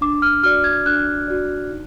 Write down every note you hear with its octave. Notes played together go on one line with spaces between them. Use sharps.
D4 D6
F6
F#4 D5 F6
G#6
D4 F#6
F#4 D5
D#4